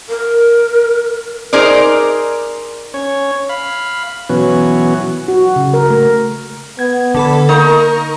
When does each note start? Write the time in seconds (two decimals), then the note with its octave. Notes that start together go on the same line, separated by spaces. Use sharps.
0.09 A#4
1.53 D#4 G#4 A#4 C5 D5
2.94 C#4 C#5
3.49 F5 B5
4.29 B2 E3 F#3 B3 C#4 F#4
5.28 F#4
5.56 C#3
5.73 A#4
5.90 A3
6.79 B3 G#6
7.15 D3 A4 B5
7.49 A#3 D#4 A#4 C#6